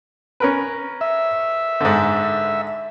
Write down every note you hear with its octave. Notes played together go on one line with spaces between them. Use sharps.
C#4 A#4 B4
E5
G#2 D3